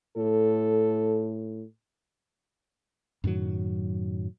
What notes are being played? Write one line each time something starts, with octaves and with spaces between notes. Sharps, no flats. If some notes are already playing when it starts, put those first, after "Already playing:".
A2 A4
F#2 A2 D#3 F#3